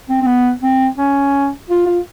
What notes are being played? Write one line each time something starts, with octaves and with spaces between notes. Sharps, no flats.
C4
C4
B3
C4
C#4
F4
F4